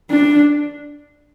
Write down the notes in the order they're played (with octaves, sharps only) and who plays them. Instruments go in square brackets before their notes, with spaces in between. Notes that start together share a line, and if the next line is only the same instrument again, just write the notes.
[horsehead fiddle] D4